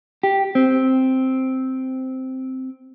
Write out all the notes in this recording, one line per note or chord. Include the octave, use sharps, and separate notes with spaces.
G4
C4